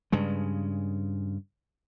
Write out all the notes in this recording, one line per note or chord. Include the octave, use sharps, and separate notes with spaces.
G2 C#3 G#3